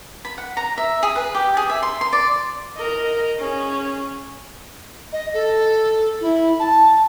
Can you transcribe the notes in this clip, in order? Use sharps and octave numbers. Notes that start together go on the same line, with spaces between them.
B5
F#5
A#5
E5
G#4
B4
G4
G#4
E5
C6
C6
D5
A#4 D#5
C#4 G#4
D#5
A4
E4
A5